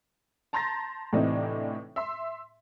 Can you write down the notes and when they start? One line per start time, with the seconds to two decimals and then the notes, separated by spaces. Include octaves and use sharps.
0.53 A5 A#5 C6 G6 A6 A#6
1.13 A2 C3 E3 C4 D4 D#4
1.96 E5 C6